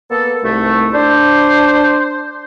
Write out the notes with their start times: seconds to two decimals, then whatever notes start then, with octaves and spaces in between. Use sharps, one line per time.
0.11 A#3 B3 A4
0.43 C2 G#2 A3
0.93 D4 C5